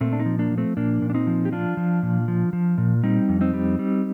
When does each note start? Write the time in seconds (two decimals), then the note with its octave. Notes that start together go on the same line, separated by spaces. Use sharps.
0.01 A#2 A3 C4
0.13 D4
0.20 C4 D#4
0.26 F3
0.39 A#3 D4
0.51 F3
0.58 A3 C4
0.77 A#2 A#3 D4
1.02 A#2
1.10 D4
1.14 C4 D#4
1.27 F3
1.45 G4
1.52 F3 D4 F4
1.77 F3
2.03 A#2
2.28 F3
2.53 F3
2.78 A#2
3.03 G3 C4 D#4
3.29 F2
3.41 C4 D#4
3.54 G3
3.79 G3